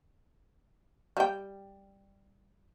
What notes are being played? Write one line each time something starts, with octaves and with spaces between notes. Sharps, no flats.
G3 G5